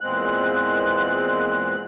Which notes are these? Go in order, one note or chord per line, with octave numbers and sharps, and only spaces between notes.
E2 A#2 G#3 C4 F#6